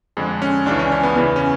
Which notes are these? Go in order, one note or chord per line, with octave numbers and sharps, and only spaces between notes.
F2 D3 G#3
C#4
C#2 C#3 E3 D4
C#4
C#4
B3
E2 C#3 E3 B3
C#4